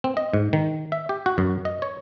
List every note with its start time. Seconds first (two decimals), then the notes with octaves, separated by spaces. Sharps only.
0.04 C4
0.17 D#5
0.33 G#2
0.53 D#3
0.92 E5
1.09 G4
1.26 F#4
1.38 F#2
1.65 D#5
1.82 C#5